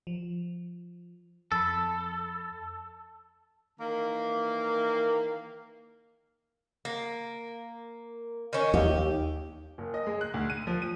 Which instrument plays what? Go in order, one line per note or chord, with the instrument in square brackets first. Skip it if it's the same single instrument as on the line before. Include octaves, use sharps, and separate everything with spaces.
[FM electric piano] F3
[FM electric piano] F2 B5 [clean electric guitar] A4
[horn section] D#3 E3 A#3
[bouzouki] A#3
D#3 C#4
[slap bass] D#2 [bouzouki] G4
[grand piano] F#1
D#5
G#3
F#6
D2
D#7
F3
D#7